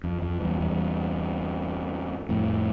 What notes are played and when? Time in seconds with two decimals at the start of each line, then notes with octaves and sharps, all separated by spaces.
0.04 F2
0.22 F2
0.41 E2 G2
0.60 E2 G2
2.29 F2 A2